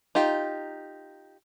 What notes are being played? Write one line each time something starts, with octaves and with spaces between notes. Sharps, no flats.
D#4 F4 G4